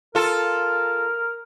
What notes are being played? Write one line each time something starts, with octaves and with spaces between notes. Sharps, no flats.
F4 A4 A#4